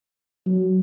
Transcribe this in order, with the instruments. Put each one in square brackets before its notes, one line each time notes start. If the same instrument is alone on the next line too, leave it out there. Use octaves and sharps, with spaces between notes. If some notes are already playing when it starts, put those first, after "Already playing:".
[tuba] F#3